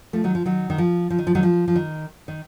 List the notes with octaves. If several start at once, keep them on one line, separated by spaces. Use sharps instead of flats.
F3 A3
D#3 F#3
F3
D#3 F#3
D#3
F3
F3
D#3
F3
D#3 F#3
F3
F3
D#3
D#3